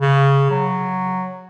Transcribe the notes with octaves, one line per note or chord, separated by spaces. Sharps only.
C#3
F#3